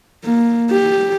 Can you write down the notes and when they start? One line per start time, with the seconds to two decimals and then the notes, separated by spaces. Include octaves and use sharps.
0.24 A#3
0.71 G4